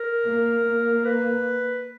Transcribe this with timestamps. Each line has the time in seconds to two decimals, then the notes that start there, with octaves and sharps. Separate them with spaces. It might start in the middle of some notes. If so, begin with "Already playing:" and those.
Already playing: A#4
0.25 A#3
0.65 A#3
1.05 B4